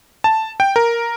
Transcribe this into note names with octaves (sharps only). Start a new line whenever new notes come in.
A5
G5
A#4